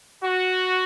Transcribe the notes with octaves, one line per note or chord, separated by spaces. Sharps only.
F#4